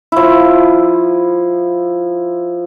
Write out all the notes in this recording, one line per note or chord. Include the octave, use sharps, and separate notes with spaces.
F3 E4